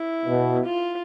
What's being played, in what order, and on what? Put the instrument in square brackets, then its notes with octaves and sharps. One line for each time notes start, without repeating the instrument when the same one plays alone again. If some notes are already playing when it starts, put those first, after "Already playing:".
Already playing: [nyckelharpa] E4
[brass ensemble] B2
[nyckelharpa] F4